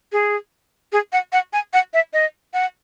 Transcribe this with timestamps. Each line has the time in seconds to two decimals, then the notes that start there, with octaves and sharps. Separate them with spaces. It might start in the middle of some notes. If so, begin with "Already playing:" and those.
0.12 G#4
0.92 G#4
1.13 F#5
1.33 F#5
1.53 G#5
1.73 F#5
1.94 E5
2.13 D#5
2.54 F#5